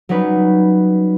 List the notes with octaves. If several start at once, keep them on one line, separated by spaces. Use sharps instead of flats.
F#3 G3 C#4 D#4 B4